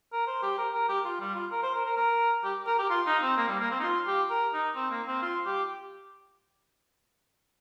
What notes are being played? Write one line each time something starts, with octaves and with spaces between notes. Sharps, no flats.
A#4
C5
G4
A#4
A#4
G4
F4
G3
F4
A#4
C5
A#4
A#4
A#4
G4
A#4
G4
F4
D#4
C4
A#3
G3
A#3
C4
D#4
F4
G4
A#4
D#4
C4
A#3
C4
F4
G4